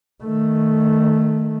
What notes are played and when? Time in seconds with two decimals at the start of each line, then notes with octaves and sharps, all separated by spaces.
0.23 D#3 A3